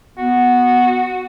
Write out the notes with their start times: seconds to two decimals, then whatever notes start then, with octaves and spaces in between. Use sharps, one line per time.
0.18 B3 F#4